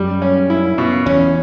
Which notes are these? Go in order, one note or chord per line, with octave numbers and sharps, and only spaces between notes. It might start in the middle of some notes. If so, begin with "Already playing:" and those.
Already playing: F#2 G3
C#4
E4
B2
E2 C#4